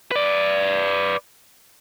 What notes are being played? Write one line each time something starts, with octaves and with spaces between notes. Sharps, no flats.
B4 D5